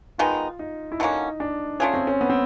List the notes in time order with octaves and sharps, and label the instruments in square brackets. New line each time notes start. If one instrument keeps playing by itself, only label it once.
[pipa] D#3 G#3 B3 D#4 [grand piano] F4
[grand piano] D#4
E4
[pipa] D3 F#3 A#3 C#4 [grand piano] D#4
[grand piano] D4
[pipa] A3 D4 F4 G#4 [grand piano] C#4
[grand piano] C4
C#4
B3
C4